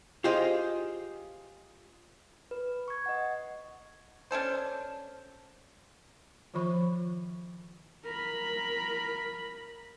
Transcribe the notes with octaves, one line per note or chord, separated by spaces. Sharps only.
F4 G4 G#4 C5 D#5 F5
B4
C#6 G#6
D#5 F#5
C#4 D4 A4 C5
D#3 F3 F4 C5 B5 C#6
A#4 B5